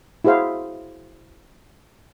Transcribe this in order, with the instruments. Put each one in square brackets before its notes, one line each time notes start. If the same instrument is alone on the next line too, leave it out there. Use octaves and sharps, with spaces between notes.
[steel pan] E4 F#4 G#4 C5 F5